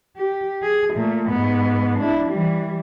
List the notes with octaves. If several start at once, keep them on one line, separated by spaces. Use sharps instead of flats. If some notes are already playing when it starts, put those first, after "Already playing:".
G4
G#4
A#2 A3
G#2 B3
D4 E4
E3 G3